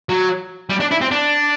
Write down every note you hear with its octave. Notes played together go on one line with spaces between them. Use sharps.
F#3
G3
D4
E4
C4
D4